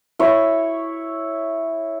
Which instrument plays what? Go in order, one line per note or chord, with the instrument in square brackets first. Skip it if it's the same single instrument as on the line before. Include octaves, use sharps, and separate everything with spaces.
[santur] E4 C#5